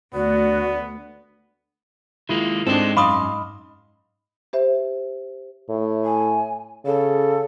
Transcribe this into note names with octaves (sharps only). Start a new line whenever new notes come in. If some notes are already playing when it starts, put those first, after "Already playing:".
D2 B3 F#4 D5
D#3 G#3 A#3 E4 F4
G#2 G#3 C4 D4 A4 D#5
F#2 F5 B5 C6 D6 D#6
G4 C5 E5
A2
G#5
C#3 A4